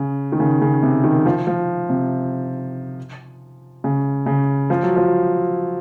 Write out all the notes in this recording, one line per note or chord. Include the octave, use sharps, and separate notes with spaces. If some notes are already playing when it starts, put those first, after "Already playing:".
Already playing: C#3
D#3
C#3
C#3
C3
D#3
F3
F3
C3
C#3
C#3
F3
F#3
F3